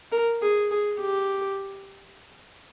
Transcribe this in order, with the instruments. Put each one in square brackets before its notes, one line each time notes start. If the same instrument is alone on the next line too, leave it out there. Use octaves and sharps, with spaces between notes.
[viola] A#4
G#4
G#4
G4